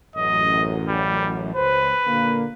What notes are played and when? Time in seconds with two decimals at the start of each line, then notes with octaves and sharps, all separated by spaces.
0.16 A1 F#2 D#5
0.88 G3
1.55 C#2 B4 C5
2.06 A#2 D3 A#3